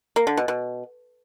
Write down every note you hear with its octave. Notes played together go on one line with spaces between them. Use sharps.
A#3
D3
B2
B2